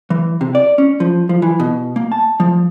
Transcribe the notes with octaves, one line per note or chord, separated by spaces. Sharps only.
E3
C3
D5
C#4
F3
F3
E3
B2
A#3
A5
F3